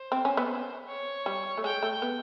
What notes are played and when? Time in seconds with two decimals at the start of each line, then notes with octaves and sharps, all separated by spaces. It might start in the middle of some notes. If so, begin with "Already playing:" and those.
Already playing: C5
0.12 C4
0.25 C#4
0.37 B3
0.88 C#5
1.26 G3
1.57 A3
1.64 G#3 G5
1.83 A3
2.02 B3